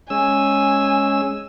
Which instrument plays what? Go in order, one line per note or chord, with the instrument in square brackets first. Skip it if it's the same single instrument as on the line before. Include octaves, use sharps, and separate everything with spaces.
[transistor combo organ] G#3 C#4 E6 [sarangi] G#5